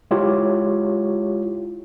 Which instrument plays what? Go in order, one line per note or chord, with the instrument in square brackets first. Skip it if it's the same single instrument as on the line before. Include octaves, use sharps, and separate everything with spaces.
[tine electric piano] G#3 E4 F4 G4 C#5